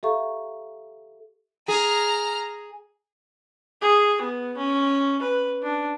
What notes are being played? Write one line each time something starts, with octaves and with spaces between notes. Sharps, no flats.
G4 A4 E5 F5 A#5 C#6
G#4 A#5 F6
G#4
B3
C#4
B4
D4